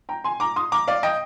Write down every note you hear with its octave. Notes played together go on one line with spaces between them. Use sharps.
G5 A#5
G#5 C6
A#5 D6
C6 D#6
A#5 D6
D5 F5
D#5 G5